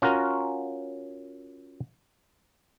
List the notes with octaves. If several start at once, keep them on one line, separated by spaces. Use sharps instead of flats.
C#4 F4 F#4 A#4